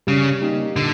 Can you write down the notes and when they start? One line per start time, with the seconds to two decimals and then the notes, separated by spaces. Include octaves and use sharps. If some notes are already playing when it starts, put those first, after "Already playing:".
0.07 C#3 G3
0.42 A#3 D#4 G4
0.76 A#2 D3